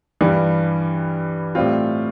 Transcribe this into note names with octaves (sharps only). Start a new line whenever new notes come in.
G2 E3 G3
A2 G3 C4 F4